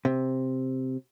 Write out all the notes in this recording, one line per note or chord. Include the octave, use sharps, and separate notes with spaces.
C3